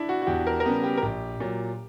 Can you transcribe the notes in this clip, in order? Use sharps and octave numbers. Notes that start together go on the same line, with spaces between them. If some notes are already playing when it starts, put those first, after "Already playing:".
Already playing: D4 E4
F#4
F#4
E2 G4
A#4
A#4
C#3 G3 B3 G4
G4
A#4
A#1 G4
A#2 F#3